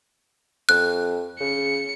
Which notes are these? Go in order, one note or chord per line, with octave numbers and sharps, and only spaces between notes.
F2 F#6
C#3 C#7